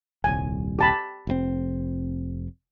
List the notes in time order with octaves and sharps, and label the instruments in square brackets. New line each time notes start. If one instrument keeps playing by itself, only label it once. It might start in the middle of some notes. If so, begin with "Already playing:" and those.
[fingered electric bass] D#1 C2 [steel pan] G#5
[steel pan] G4 A5 B5
[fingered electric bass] F1 A#2 C4